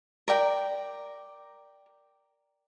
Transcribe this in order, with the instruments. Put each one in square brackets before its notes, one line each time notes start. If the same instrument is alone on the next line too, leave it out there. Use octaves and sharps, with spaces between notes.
[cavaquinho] A#4 D5 G5 A#5